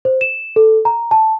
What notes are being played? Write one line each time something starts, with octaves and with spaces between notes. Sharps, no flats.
C5
E7
A4
A#5
A5